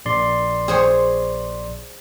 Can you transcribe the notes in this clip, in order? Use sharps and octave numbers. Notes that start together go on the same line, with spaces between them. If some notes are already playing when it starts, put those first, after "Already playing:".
A#1 D5 C6
G#4 C5 C#5